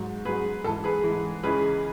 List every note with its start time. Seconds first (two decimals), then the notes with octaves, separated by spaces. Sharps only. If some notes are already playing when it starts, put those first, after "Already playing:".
Already playing: G#2 F#3
0.25 G#2 F#3 G#4 B4
0.64 G#2 E3 A4
0.84 G#4 B4
1.04 G#2 E3
1.43 C#2 C#3 E3 G#4 B4